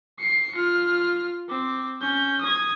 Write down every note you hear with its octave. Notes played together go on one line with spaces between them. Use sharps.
C7 C#7
F4 F6
C4 D6
C#4 G6
D#6 G#6